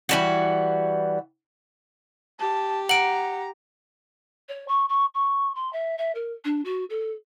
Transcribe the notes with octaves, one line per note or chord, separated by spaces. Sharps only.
E3 G3 F#4
G4 A5
F#5 A#5 D7 F#7
C#5
C#6
C#6
C#6
C6
E5
E5
A#4
D4
F#4
A4